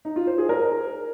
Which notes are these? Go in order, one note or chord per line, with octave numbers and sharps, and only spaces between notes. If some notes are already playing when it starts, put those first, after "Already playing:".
D#4
F4
C5
G#4
A#4